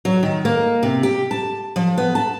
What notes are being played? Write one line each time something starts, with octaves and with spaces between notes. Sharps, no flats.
F#3
D#3
A#3
C3
G4
A5
F3
B3
A5